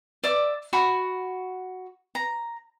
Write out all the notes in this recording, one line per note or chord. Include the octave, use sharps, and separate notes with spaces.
D5 E5 D6
F#4 B5 C#6
A#5